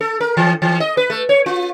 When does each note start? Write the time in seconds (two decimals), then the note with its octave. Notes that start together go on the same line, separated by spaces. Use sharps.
0.01 A4
0.21 A#4
0.37 E3
0.62 E3
0.80 D#5
0.97 B4
1.10 A3
1.29 C#5
1.46 F4